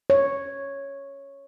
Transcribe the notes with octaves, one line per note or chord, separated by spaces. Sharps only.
C#5